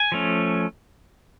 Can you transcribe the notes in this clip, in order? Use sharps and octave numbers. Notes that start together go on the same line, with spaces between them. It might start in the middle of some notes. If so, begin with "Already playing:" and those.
Already playing: G#5
F3 A3 C#4